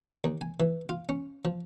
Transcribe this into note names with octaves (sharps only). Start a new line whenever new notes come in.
D#2
G#5
E3
F4
C#4
F3